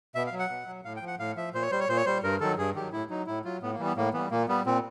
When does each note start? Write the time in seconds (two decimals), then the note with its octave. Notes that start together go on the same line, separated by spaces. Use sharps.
0.15 B2 E5
0.27 F5
0.32 F#3
0.39 F#5
0.49 B2
0.67 F#3
0.85 A2 F5
0.97 G5
1.02 F3
1.07 F#5
1.19 A2 F5
1.36 F3 E5
1.54 A#2 C5
1.62 C#5
1.71 G3 C5
1.80 C#5
1.89 A#2 C5
1.97 C#5
2.06 G3 C5
2.24 G2 A#4
2.40 D#3 F#3 A4
2.58 G2 G#4
2.75 D#3 F#3 G4
2.92 A2 E4
3.10 F#3 D#4
3.27 A2 E4
3.45 F#3 F4
3.62 A2 B3
3.74 A#3
3.79 E3 G3
3.85 B3
3.96 A2 A#3
4.13 E3 G3 B3
4.31 A#2 A#3
4.48 G3 B3
4.66 A#2 C4